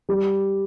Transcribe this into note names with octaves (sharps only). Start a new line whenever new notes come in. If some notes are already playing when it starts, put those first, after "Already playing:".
G3